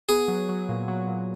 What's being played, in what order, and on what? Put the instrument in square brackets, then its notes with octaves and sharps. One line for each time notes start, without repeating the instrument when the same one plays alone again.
[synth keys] B3 [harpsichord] G#4
[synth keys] F#3
F#3
A#2
F#3
A#2